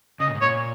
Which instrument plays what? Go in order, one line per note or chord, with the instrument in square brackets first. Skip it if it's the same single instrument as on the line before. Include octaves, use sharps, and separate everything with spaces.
[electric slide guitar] C#3 [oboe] D#5
[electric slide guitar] A#2
G#2
[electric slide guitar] A#2 [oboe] C#5